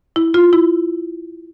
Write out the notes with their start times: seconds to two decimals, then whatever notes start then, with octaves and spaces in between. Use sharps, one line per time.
0.16 E4
0.34 F4
0.53 E4